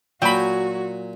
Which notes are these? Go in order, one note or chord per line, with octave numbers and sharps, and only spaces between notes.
A#2 F#3 F#4 G5 G#5 B5